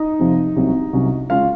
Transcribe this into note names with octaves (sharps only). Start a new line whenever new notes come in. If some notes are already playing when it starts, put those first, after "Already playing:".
Already playing: D#4 D#5
F2 C3 F3
C2 C3 F#3 C#4
C2 C3 F#3 C#4
C#3 G#3 C#4 F4 F5